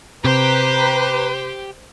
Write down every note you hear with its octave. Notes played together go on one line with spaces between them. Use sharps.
C3 G4 B4 C5 G5 A#5